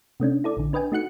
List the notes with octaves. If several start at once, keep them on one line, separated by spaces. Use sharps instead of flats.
C3 A3 C#4 D4
E4 A4 D5
A#1 D3
D4 B4 D#5 G5 G#5
A3 D#4 F#4 F#6 C#7